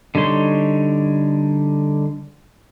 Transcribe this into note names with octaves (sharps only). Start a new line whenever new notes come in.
D3 G3 D#4 C#5 C6